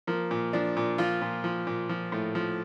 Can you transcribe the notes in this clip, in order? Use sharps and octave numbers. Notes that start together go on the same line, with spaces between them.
F3 A#3
A#2
F3 D4
A#2
F3 F4
A#2
F3
A#2
F3
A2
F3